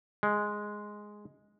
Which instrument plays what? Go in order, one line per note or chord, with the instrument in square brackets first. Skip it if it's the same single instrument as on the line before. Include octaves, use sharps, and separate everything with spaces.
[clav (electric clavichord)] G#3